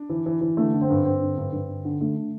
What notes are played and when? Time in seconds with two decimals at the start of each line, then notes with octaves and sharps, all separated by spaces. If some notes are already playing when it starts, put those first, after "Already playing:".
Already playing: D4
0.10 E3
0.26 E3
0.41 E3
0.57 D3 A3
0.74 D3
0.81 C4
0.90 G2
1.05 G2 C4
1.22 D3
1.38 G2
1.53 G2
1.68 D3
1.85 D3
2.01 D3 A3
2.17 D3